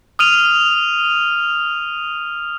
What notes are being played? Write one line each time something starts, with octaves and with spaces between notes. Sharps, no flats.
D#6 F6 D#7 F7